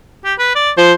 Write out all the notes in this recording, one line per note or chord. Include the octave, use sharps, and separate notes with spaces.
G4
B4
D5
F3 C5